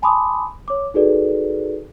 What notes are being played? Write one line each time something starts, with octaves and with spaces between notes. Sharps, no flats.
G#5 A5 B5 C6 D6 D#6
C#5 D6
D#4 F#4 G#4 A4 B4 D5